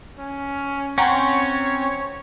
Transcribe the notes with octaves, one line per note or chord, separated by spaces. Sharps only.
C#4
C4 C#4 C#5 F#5 G5 A#5